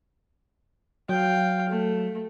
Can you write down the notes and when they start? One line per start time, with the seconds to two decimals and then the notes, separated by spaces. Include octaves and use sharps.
1.09 F#3 F5 G5
1.69 A3